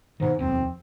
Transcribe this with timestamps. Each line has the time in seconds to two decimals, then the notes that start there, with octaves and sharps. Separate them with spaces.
0.20 G#2 B2 D#3
0.39 D#1 B1 F2 C4